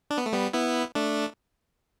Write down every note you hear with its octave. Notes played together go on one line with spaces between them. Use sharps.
D4
B3
A3
G3 B3
B3 E4
A3 D4